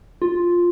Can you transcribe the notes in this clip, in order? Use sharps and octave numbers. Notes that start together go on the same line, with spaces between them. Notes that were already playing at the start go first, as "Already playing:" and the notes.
F4